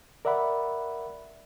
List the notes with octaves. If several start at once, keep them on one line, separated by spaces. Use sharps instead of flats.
A#4 D5 E5 F#5 B5